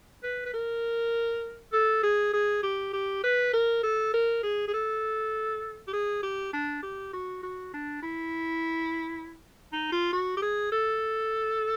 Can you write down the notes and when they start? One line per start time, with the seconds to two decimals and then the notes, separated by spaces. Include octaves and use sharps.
0.23 B4
0.46 B4
0.54 A#4
1.73 A4
2.03 G#4
2.33 G#4
2.63 G4
2.93 G4
3.23 B4
3.53 A#4
3.83 A4
4.14 A#4
4.43 G#4
4.68 G#4
4.74 A4
5.87 G4
5.93 G#4
6.23 G4
6.53 D4
6.82 G4
7.13 F#4
7.43 F#4
7.73 D4
8.02 E4
9.72 D#4
9.92 F4
10.13 F#4
10.37 G4
10.42 G#4
10.72 A4